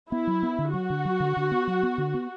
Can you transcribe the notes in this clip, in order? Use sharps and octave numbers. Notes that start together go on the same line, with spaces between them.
B3 E4
F#3
B3
D3
F#3 F#4
D3
F#3
D3
D3
B3
F#3
B3
D3
B3